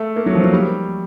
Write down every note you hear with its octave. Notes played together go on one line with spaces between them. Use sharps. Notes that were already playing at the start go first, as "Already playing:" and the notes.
Already playing: A3
A#3
F#3
F3
F#3
G3